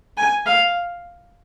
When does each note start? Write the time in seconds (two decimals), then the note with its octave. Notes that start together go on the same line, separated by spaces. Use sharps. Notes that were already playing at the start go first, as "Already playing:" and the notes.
0.17 G#5
0.46 F5